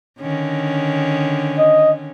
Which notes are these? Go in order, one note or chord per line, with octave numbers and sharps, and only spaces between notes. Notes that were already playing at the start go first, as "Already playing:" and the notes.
D3 D#3 C#4
D#5